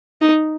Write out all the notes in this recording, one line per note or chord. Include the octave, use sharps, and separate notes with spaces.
D#4